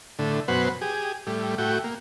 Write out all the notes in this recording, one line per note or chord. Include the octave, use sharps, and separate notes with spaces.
A2 D3
F#2 B2 B4 C5 F#5
G4 G#4
A2 G3
A2 F#4 G5
A#3